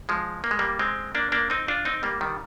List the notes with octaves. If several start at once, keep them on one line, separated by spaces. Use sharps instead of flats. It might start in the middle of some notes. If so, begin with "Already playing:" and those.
F3 G#3
A#3
G#3
G3 A#3
G#3 C4
A#3 D4
A#3 D4
C4 D#4
D4 F4
C4 D#4
G3 A#3
D#3 G3